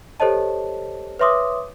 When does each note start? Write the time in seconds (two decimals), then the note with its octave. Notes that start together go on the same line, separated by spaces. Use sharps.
0.20 G4 A4 C5 C#5 D#5 A5
1.19 B4 C#5 E5 C6 D6 D#6